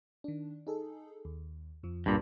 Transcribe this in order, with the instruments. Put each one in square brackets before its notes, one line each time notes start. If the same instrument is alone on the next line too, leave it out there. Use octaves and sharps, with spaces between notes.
[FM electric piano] D#3 D4
D#4 G#4 A4
D#2
F2 F3
[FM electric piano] C#2 [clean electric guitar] G2 A#2